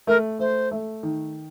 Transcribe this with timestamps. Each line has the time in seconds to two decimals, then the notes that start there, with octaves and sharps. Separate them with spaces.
0.07 A3 A#4
0.39 A3 C5
0.71 A3
1.03 D#3